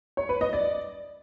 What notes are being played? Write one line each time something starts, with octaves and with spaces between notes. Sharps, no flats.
C#5
B4
D#5
D5